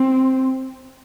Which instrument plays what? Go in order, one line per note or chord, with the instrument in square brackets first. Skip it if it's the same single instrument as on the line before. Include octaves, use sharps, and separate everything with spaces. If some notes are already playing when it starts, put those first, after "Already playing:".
Already playing: [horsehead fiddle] C4